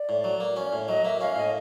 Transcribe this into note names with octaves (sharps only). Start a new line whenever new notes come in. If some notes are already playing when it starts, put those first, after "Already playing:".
Already playing: D5
A2
F#3
A#3
C#4
A2
F#3 D#5
A#3 E5
C#4 F5
A2 D#5